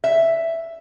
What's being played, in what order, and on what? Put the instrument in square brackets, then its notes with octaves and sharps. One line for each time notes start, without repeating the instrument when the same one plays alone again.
[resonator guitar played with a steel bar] E5